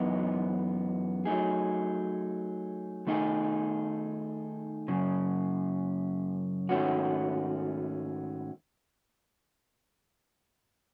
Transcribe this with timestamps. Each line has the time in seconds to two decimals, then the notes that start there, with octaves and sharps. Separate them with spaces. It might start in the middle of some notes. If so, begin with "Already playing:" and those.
Already playing: F#2 E3 G#3 B3 D#4
1.25 F#3 A3 D#4 G#4
3.07 D#3 A3 D#4 G#4
4.88 F#2 C#3
6.69 G#2 D#3 A3 C#4 F#4